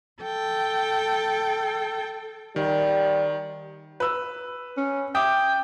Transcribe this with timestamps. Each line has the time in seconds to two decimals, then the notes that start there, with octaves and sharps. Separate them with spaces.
0.22 A4 G5
2.56 D#3 G3
4.00 B4 E6
4.77 C#4
5.15 E5 G5 D6 D#6